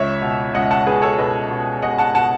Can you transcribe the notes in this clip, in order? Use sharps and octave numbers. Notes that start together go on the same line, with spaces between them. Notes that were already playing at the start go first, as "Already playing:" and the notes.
Already playing: C#2 C#5 E5
B2
C#2 D#5 F#5
F#5 A5
B2 G#4 B4
A4 C#5
B2 B4 D#5
B2
B2 D#5 F#5
F#5 A5
B2 F#5 A5